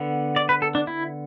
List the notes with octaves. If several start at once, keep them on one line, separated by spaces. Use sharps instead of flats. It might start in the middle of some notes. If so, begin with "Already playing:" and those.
Already playing: D3 B3
D5
B4
A4
D4
E4